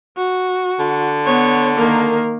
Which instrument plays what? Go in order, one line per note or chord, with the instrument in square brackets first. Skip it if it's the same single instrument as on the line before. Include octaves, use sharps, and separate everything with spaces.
[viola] F#4
[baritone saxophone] D3
[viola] B3 C#5
D#3 A#3